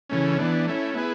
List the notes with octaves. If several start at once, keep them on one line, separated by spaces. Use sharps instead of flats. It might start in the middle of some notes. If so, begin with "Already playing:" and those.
C#3 E3 A3 C#4
E3 B3 D4
A3 C#4 E4
B3 E4 G#4 B4